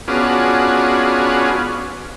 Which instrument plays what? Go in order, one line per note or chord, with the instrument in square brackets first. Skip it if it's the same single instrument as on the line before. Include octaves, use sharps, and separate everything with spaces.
[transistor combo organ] B3 C#4 D4 F4 F#4 G#4